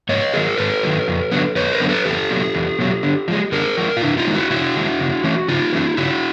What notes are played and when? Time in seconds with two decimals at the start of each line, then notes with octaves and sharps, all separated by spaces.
0.09 G#2 C#5 D#5
0.34 D#3 F#3 G#4 A#4
0.58 G#2 A4 B4
0.83 D#3 F#3
1.08 F2
1.31 D3 F#3 B3
1.56 F2 B4 C#5
1.72 A#4 C5
1.80 D3 F#3 B3
1.89 A4 B4
2.05 E2 G4 A4
2.30 B2 F#3
2.55 E2
2.79 B2 F#3
3.03 D3
3.28 F3 G#3
3.52 D3 G#4 A#4
3.77 F3 G#3
3.97 F4
4.01 C3 D4 E4
4.17 D#4 F4
4.26 D#3 G#3
4.34 E4 F#4
4.50 C3 E4 F#4
4.75 D#3 G#3
5.00 C#3
5.24 E3 A3 C#4
5.48 C#3 D#4 F4
5.73 E3 A3 C#4
5.97 C#3 E4 F#4